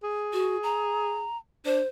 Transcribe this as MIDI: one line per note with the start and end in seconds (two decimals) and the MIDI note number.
0.03 1.26 68
0.33 0.57 66
0.63 1.37 82
1.65 1.80 62
1.65 1.87 72